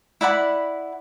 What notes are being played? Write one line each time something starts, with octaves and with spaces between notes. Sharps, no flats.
E4 D5 F#5 B5